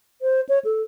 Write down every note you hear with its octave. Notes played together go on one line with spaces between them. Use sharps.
C5
C#5
A4